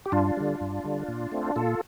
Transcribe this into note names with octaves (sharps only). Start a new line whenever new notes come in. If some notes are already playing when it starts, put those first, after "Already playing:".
G4
G2 D4 F4
D3 G3
G2
D3 G3
A#2
A3 C4
A#2 F4 A4